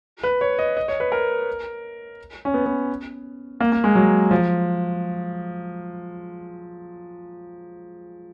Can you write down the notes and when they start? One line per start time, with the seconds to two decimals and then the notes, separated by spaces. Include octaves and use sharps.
0.23 B4
0.41 C#5
0.59 D#5
0.77 D#5
0.88 C#5
1.00 B4
1.12 A#4
2.45 C#4
2.54 B3
2.66 B3
3.60 A#3
3.72 A#3
3.84 G#3
3.95 F#3
4.31 F3